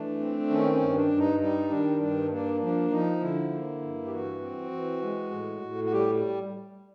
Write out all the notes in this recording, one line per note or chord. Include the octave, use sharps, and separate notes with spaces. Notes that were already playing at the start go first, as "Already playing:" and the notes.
Already playing: E3 A3 D4
C4
D#3 C#4
C#4
G2
D4
G2
D#4
G3 D#4
D#3 D4
G2 D4
A#3 D4
F3 D4
F3 D#4
D3 E4
A#3
G2
G4
E3 F#4
C4
E3
G#3
A2
A2
F#4
G3 G4